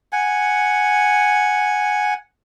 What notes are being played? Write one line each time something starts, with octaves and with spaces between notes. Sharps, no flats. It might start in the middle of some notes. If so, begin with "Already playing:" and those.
F#5 G#5